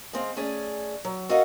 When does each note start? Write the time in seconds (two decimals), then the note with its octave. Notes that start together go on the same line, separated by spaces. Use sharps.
0.13 G#3 C4 F5
0.36 A3 C#4 G#4 D5
1.05 F#3
1.29 F#4 A4 A#4 D#5 F5 F#5